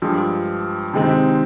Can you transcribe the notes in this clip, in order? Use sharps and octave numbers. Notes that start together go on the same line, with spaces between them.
G2 F3 G#3
C3 D#3 G#3 C4 D#4